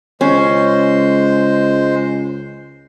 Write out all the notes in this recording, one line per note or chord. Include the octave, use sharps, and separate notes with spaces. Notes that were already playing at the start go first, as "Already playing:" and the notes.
C#2 G#3 C#4 C5